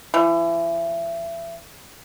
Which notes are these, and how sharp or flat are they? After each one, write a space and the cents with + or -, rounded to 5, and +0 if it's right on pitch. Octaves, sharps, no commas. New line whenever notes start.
E3 +30